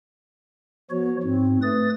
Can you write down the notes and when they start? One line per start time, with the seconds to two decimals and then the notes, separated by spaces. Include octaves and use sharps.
0.90 F3 B3 F#4 C#5
1.23 G#2 C4
1.62 A3 B4 D#6 A6